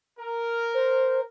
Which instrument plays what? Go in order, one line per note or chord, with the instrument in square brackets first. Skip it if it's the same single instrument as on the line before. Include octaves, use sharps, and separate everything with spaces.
[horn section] A#4
[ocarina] C5